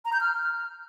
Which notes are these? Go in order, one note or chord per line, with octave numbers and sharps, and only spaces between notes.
A#5
G6
F6